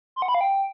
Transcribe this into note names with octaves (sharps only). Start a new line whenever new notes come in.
C6
F#5
B5
F5
G5